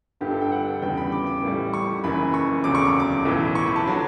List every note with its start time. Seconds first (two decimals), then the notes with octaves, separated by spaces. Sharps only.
0.21 G1 G2 D3 G3 G4
0.31 A4
0.41 G5
0.52 F#5
0.82 E2 C#3 G3 G5
0.97 B5
1.12 D6
1.27 D6
1.42 A1 A2 G3
1.74 C#6
2.04 F#1 F#2 E3 B5
2.34 C#6
2.64 E1 D2 C#3 F#3 D6
2.75 C#6
2.85 D6
3.00 D6
3.25 B1 A2 E3
3.55 C#6
3.66 B5
3.76 A5
3.87 D3 F#3